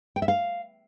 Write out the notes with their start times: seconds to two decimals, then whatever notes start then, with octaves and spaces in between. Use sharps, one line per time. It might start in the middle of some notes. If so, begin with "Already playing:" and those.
0.16 G5
0.22 E5
0.28 F5